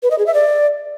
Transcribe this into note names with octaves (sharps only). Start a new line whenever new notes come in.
B4
D#5
G#4
E5
D5